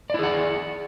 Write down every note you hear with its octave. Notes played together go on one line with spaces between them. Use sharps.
E4 G#4 D5 F#5